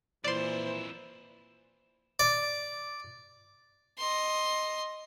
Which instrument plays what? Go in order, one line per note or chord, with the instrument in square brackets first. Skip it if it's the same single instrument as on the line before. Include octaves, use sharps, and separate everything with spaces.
[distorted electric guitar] F2 E4 [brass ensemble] A#2 E3 [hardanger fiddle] C5 [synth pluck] D5 C6
[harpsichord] D5
[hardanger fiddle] D#5 C6